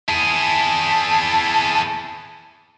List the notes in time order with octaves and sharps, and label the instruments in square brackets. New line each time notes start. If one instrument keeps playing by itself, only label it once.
[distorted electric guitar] E4 G#4 [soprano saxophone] A5